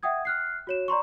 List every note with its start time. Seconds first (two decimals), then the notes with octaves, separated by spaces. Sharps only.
0.03 E5 F#5 G5 D#6 G#6
0.25 F6 F#6 C7
0.67 F#4 C#5 E7
0.88 D5 A#5 C6 C#6